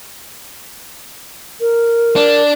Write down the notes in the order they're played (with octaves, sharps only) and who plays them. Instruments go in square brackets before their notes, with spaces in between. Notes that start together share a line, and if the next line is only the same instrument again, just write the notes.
[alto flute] A#4
[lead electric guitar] D4